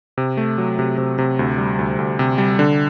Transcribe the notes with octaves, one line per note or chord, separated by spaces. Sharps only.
C3
A3
F#3
C3
C3
C3
D2
G3
D2
D2
C3
G3
D3